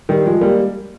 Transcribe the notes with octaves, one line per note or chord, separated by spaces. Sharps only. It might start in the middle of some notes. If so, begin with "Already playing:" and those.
D#3 G3
F3 G#3
G3 A#3